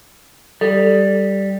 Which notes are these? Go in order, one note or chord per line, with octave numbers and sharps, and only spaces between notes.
G3 A4